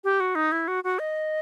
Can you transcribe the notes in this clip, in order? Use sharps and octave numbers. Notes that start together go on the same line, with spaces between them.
G4
F#4
D#4
E4
F#4
F#4
D#5